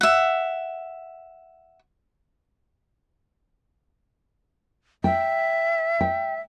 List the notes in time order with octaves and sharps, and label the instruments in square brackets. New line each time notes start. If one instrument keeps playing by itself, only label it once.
[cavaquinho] E5 F#5
[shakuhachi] E5 [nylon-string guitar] G5
[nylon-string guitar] G5